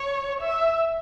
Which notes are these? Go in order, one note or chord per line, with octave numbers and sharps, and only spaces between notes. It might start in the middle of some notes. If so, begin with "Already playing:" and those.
Already playing: C#5
E5